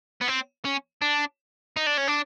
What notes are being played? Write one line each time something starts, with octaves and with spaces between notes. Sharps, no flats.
B3
C4
C#4
D4
D#4
D4
C#4
D4